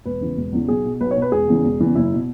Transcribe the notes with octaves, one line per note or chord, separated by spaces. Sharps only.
E1 B4
E2 C#3 E3
E1
E2 C#3 E3
B1 G#4
B2
B1 B4
C#5
B2
B4
E1 G#4
E2 C#3 E3
E1
E2 C#3 E3
F#1 E4
B2